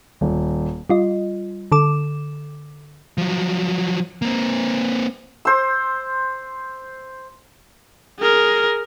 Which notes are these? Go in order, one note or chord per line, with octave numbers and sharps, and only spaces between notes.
D#1
G3 F4 D#5
D3 A4 D6 E7
F3 F#3
A#3 C4
C5 E6
G#4 A#4